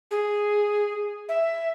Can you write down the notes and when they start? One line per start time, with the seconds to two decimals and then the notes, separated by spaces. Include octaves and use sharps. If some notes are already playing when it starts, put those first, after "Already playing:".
0.11 G#4
1.29 E5